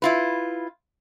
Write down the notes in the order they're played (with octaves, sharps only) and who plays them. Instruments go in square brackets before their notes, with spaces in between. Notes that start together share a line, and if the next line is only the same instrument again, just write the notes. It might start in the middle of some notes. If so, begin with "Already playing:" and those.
[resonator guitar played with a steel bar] E4 F4 B4